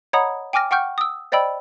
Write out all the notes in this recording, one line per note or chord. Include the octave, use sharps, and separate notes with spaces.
C#5 D#5 F#5 A#5 B5 D#6
G5 G#5 D6 F6 A#6
F#5 G5 C#6 F6 G6
D#6 E6
C5 D5 D#5 G5 B5 E6